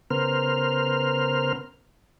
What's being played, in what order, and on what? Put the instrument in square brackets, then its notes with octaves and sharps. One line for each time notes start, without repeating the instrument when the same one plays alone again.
[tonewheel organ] C#3 B3 A#4 C5 F6